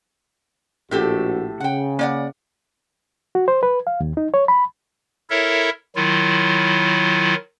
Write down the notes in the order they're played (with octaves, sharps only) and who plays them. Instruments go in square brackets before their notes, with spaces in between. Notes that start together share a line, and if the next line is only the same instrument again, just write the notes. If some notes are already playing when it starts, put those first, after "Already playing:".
[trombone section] A#1 F#4 [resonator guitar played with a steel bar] A2 G4 A4
[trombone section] C#3 [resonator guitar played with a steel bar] F#5 G5
[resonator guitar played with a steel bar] A#3 D5 F#5
[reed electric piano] F#4
C5
B4
F5
D#2
D#4
C#5
B5
[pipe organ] E4 A4 A#4 C#5 E5
D#3 F#3 E4 F4